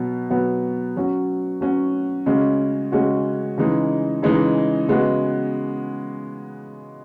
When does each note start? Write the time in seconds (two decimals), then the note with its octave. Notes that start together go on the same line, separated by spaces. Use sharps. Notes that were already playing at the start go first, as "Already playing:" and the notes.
Already playing: B2 F#3 B3
0.30 B2 F#3 B3
0.96 F#3 C#4 F#4
1.61 F#3 C#4 F#4
2.26 C#3 G#3 C#4 F#4
2.92 C#3 G#3 C#4 F#4
3.57 C#3 E3 G#3 D#4
4.23 C#3 E3 G#3 D#4
4.88 C#3 G#3 B3 F#4